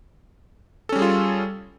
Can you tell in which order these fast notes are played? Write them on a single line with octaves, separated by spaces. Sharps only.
A4 C#4 G3 G#4 F4